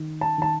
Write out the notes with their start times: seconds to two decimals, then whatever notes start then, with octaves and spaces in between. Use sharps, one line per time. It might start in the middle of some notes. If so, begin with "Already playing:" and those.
Already playing: D#3
0.21 A5
0.38 D#3 A5